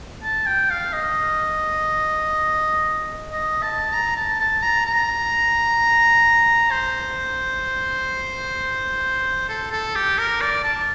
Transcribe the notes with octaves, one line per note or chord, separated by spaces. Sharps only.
A5
G5
F5
D#5
D#5
A5
A#5
A5
A5
A#5
A#5
C5
A4
A4
G4
A#4
D5
A5